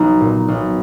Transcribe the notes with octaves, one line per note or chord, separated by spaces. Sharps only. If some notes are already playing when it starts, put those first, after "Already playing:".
Already playing: B1 D#4
A#2
B1